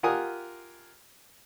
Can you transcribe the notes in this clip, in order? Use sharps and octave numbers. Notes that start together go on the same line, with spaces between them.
F4 G4 A#4 F#5 G#5 D#6